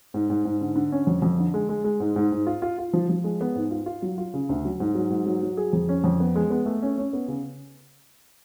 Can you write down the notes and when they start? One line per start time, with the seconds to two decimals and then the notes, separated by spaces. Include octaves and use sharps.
0.14 G#2
0.30 G#2
0.45 G#2
0.61 D3
0.76 D3
0.92 C#4
1.07 F2
1.22 F2
1.39 D3
1.54 G#3
1.69 G#3
1.84 G#3
2.00 G#2
2.16 G#2
2.32 G#2
2.47 F4
2.62 F4
2.78 F4
2.93 F3
3.10 F3
3.24 G#3
3.41 B3
3.56 G#2
3.71 F4
3.86 F4
4.02 F#3
4.18 F4
4.34 C#3
4.49 D2
4.65 F#3
4.80 G#2
4.95 F#3
5.10 G#2
5.26 F#3
5.42 F#3
5.57 G#4
5.73 F2
5.89 C#4
6.04 F2
6.20 B3
6.36 G#3
6.50 B3
6.66 A3
6.82 C#4
6.98 C#4
7.13 B3
7.28 C#3